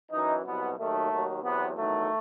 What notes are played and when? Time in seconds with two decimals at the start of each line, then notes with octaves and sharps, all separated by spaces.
0.12 F#2 E3 D#4
0.45 C2 B2 F#3 B3
0.77 D#2 D#3 F#3 A3
1.10 D#2 D#3 F#3
1.42 E2 C3 F#3 B3
1.75 E2 D#3 F#3 A3